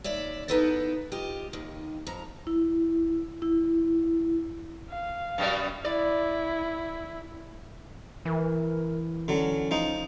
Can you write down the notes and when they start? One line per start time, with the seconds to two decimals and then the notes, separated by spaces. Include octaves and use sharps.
0.04 D#2 C#5 D5 E5
0.48 B3 D#4 E4 A4 B4 C5
1.12 F4 G4 D#5
1.53 D#2 D#3
2.07 F2 A#5
2.47 E4
3.42 E4
4.90 F5
5.38 F#2 B2 G3
5.85 E4 D5
8.25 E3 A#4
9.28 D3 F#3 C#4
9.71 F3 D#4